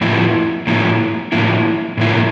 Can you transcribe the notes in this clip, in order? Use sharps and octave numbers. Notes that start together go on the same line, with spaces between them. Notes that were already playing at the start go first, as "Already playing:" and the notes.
A2 F3 A#3 E4
A2 F3 A#3 E4
A2 F3 A#3 E4
A2 F3 A#3 E4